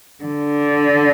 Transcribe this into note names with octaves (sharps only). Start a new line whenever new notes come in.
D3